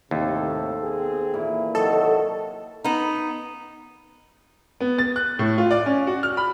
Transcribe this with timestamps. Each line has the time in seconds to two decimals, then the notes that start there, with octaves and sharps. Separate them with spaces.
0.11 D#2 A2 C3 A4
0.82 B3 C4 G#4
1.34 A#2 E3
1.75 C3 D#3 F#3 F#4 A4 D#5
2.84 B3 D#4
4.80 B3
4.99 A6
5.16 F#6
5.39 A2
5.58 F4
5.71 D5
5.86 C#4
6.07 F#4
6.23 F6
6.37 B5